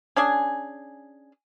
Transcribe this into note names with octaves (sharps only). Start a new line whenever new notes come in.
C#4 D4 G#4 G#5